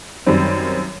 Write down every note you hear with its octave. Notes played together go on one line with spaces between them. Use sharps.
F#2 D#3 G3 C4